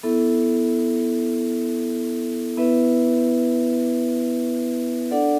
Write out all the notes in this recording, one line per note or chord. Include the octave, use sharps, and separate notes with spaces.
B3 E4 A4 E5
B3 E4 B4 E5
D4 A4 D5 F#5